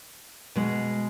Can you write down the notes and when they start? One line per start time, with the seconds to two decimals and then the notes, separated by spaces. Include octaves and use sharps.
0.55 B2 G#3